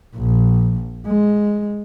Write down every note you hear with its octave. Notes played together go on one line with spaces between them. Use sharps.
A#1
G#3